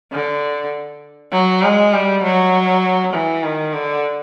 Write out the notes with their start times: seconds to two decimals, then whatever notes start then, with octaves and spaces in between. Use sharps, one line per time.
0.12 D3
1.32 F#3
1.62 G#3
1.93 G3
2.23 F#3
3.13 E3
3.43 D#3
3.73 D3